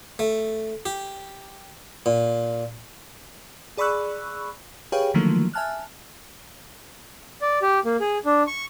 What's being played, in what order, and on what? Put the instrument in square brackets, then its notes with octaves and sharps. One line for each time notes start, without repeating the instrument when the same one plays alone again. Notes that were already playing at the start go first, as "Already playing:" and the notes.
[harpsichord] A3
G4
A#2
[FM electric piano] G#4 D5 B5 C#6 E6 F#6
G4 G#4 B4 C#5 F5 G5
D3 D#3 F3 F#3 A3 A#3
E5 G#5 A5 F6 F#6
[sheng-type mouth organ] D5
G4
A#3
G#4
D4
C#6